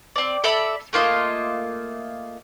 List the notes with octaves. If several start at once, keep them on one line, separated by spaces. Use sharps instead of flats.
C4 D5
A4 D5 E5 B5
A3 A#3 F4 D#5